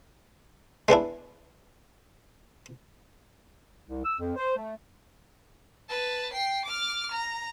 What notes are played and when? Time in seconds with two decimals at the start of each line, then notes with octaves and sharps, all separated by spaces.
0.88 G#3 B3 D4 E4
3.88 C2
4.05 E6
4.20 F2
4.36 C5
4.57 A3
5.89 B4 A5
6.32 G5 C7
6.65 D6 F6
7.11 A#5